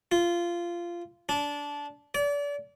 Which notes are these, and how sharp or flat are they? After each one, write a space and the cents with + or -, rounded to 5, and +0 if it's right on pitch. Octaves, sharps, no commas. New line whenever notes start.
F4 -15
D4 -20
D5 -35